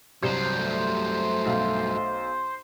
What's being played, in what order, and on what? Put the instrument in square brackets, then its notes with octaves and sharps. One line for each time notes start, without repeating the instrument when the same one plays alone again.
[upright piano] C2 [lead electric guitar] G2 F#3 [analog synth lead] C5
[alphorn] A3
[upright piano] B1 F5